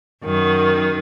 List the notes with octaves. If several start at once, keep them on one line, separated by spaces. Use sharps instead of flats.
F#2 D#3